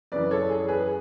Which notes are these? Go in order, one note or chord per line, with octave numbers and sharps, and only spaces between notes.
F#2 C#3 E3 B4 D5
A4 C#5
G#4
G#4 B4